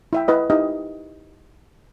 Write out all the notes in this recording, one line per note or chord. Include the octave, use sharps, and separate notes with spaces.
E4 E5 G5
E4 B4 D#5
D#4 E4 G4 D#5